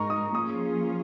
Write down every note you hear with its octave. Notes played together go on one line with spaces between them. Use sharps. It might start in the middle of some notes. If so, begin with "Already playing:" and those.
Already playing: G#2 G#3 D#4 A#4 A#5 C#6
D#6
F3 A#3 C#4 F4 G#4 D#6